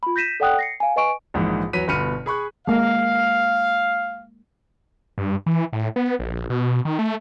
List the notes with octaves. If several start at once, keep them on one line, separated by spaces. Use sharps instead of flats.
F4 B5
G6 A#6 B6 D#7 E7
A4 D5 F#5 G5 D#6 F#6
A#6 C7 C#7
F5 G#5
B4 D#5 G#5 C#6 D7
A#1 G#2 E3
E2 F#3 B4 B6 D#7
G1 B2 B5 F6 C#7 D#7
G#4 B5 C#6 F#6
G#3 A#3 F5
G2
E3
A2
B3
A#1
B2
D#3
A3